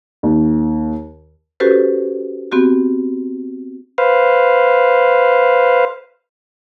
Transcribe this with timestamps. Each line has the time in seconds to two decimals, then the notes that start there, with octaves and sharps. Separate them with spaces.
0.23 D#2
1.60 C#4 F#4 G4 A4 B4 C5
2.52 B3 C4 F#4 G4
3.98 B4 C5 F5